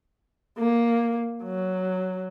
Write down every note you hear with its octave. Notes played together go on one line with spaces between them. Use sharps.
A#3
F#3